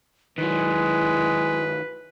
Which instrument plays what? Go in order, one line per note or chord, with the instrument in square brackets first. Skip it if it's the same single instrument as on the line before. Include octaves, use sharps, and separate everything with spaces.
[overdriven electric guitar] D#3 F#3 [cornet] G#3 [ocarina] E4 [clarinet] B4